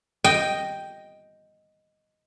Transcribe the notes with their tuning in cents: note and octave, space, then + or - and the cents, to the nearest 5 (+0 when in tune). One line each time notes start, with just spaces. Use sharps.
D#5 +0 G5 +0